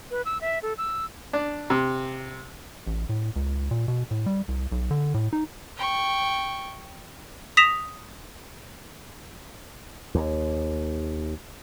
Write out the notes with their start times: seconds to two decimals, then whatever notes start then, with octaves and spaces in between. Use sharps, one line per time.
0.11 B4
0.25 E6
0.41 E5
0.63 A4
0.78 E6
1.33 D4
1.70 C3
2.87 A1
3.09 A2
3.36 C#2
3.71 A#2
3.88 B2
4.11 A2
4.26 G3
4.48 C2
4.72 B1
4.91 D3
5.14 A2
5.33 D#4
5.77 G5 C#6
7.57 D#6 A#6 B6 E7 F7
10.15 D#2